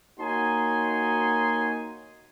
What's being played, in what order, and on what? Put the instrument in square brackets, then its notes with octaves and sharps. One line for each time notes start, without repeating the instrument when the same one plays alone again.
[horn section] A#3 D#4 F#4 C#5 G#5 C6